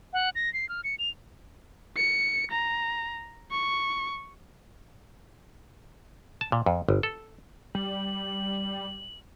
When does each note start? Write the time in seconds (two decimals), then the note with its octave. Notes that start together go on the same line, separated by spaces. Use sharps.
0.13 F#5
0.35 A#6
0.54 C7
0.69 F6
0.84 C#7
0.99 F7
1.96 C#7
2.51 A#5
3.52 C#6
6.41 A5
6.52 A#2
6.66 F2
6.89 G1
7.03 A4
7.75 G3 F#7